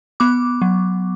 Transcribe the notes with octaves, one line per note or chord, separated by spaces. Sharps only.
B3 D6
F#3